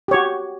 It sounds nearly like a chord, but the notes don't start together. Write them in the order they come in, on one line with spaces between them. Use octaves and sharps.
G4 C#5 F#4